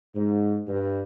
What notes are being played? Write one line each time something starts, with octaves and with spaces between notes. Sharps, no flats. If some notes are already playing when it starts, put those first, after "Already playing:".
G#2
G2